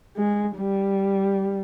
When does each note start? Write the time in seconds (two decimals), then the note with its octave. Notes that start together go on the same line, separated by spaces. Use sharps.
0.16 G#3
0.56 G3